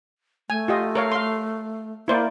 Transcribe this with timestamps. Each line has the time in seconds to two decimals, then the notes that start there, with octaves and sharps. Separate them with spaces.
0.50 A3 G#5
0.68 F4 G4 D#5
0.95 A#4 C#5 F5
1.12 F5 C6
2.08 A#3 E4 C5 D5